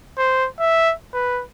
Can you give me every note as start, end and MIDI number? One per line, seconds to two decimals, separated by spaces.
0.18 0.47 72
0.59 0.94 76
1.14 1.42 71